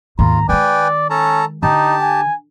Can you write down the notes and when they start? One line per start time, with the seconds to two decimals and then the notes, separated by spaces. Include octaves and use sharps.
0.19 D#2 G#2 F4 A#5
0.49 D#3 G#3 B4 D5 G5 G#5
1.10 C#4 A4 A5 A#5
1.63 D3 D#4 G4 A5
2.01 G#5